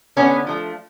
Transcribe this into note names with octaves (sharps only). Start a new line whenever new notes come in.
D3 B3 C#4
F3 A3